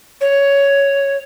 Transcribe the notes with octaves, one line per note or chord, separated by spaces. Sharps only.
C#5